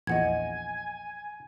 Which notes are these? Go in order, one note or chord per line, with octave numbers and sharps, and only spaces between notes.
A#1 E2 D#5 F#5 G#5 G#6